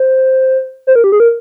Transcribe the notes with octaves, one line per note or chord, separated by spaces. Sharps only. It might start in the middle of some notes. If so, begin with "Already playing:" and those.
Already playing: C5
C5
A#4
G4
G#4
A#4